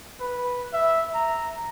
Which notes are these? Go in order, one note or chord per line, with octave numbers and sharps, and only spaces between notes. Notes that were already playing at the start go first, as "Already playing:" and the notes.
B4
E5
A#5